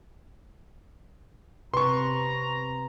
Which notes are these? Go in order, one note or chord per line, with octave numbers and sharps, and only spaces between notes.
C3 B4 A#5 C6 C#6